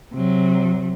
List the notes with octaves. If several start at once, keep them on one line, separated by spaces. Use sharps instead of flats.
C3 F#3